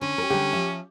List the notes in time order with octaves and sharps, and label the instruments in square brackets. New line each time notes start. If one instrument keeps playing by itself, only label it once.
[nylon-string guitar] D3 [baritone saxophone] C#4
[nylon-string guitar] G4 A#4
[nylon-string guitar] D3 G3 [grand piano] G4
[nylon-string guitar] F3 E5